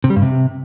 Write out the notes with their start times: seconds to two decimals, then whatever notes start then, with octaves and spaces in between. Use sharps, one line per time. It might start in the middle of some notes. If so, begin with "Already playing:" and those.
0.04 C3
0.10 G3
0.16 G2
0.22 C3